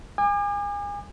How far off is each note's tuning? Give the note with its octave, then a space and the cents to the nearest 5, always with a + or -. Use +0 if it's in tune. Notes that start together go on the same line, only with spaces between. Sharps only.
G#5 -30 D6 +40